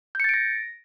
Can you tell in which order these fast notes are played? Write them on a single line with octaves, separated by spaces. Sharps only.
G6 C#7 A6 D7 A#6